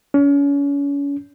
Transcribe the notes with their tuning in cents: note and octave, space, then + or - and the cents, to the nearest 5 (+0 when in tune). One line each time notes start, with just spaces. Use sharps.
C#4 +35